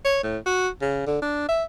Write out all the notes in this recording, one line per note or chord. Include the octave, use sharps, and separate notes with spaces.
C#5
A2
F#4
C#3
D3
D4
E5